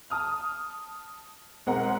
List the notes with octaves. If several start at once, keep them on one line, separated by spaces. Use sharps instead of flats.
A5 D#6 F6
B1 G#3 C4 A#4 F#5 A#5